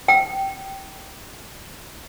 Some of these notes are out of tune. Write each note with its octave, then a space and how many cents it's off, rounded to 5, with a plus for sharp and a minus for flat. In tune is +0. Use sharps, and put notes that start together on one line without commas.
G5 -15